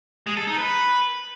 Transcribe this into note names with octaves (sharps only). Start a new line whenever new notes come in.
G#3
A4
D#4
B4